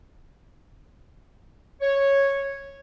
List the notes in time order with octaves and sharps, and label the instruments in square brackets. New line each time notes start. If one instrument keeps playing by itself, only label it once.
[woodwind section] C#5